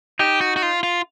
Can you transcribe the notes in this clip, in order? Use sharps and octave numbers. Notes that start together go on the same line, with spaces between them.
D#4 G4
F#4
F#4
F4
F4